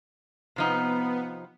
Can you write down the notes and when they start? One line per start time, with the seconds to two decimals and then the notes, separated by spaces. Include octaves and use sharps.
0.56 C3 F3 B3 D#4